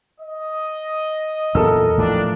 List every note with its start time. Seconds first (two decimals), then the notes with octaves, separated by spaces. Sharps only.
0.20 D#5
1.55 E2 A#2 F#3 A4 A#4 E6
1.98 A2 E3 F3 D4